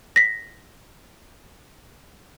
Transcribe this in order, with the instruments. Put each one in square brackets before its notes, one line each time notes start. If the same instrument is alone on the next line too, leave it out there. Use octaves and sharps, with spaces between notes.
[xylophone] A#6 B6